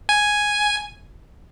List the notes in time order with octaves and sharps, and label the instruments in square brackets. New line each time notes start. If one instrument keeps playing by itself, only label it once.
[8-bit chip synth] G#5